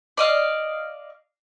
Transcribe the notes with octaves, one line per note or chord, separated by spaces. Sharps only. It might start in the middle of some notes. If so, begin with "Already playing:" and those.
D5 D#5 F5